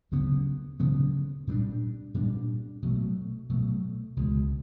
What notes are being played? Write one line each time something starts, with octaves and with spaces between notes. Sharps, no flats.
D2 C#3 F#3 B3
D2 C#3 F#3 B3
A#2 G3 B3 D4
A#2 G3 B3 D4
B2 F#3 A3
B2 F#3 A3
C#2 B2 G#3